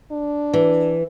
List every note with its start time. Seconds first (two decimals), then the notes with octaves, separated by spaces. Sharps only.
0.11 D4
0.53 E3